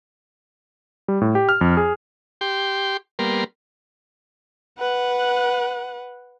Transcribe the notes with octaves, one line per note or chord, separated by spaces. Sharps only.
G3
A2
G4
F6
F2
G#4
G4 G5 C6
G3 A#3 B3 A#4 C6
B4 F#5